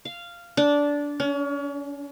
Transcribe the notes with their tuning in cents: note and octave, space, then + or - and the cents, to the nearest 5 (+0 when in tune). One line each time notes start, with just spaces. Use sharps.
F5 -10
D4 -15
C#4 +35